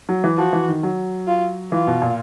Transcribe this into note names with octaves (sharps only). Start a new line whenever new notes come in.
F#3
E3
F3 F#4
E3
D#3
F#3
F4
E3 F4
B2
A#2